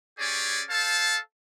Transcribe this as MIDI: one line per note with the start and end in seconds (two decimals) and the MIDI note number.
0.19 0.63 61
0.19 0.63 67
0.19 0.63 68
0.19 0.63 73
0.19 0.63 74
0.70 1.18 69
0.70 1.18 72
0.70 1.18 77
0.70 1.18 81